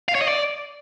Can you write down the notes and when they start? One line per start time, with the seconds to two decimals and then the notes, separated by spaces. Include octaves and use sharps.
0.08 F5
0.15 C#5
0.21 D#5
0.28 D5